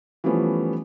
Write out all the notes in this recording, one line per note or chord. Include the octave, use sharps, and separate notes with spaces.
E3 F3 G3 A3 B3 C#4